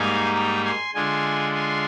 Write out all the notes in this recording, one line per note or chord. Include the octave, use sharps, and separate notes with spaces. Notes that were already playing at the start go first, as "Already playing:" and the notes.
Already playing: G#2 G3 A#3 D#4 F5 G#5
G5 A#5
G#5 C6
D3 G#3 D4 F4 G#5 C6
G#5 C6